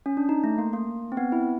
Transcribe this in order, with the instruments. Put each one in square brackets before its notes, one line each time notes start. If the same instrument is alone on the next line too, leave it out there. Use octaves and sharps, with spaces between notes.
[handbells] C#4
D4
D#4
A3
A#3
A#3
C4
B3
E4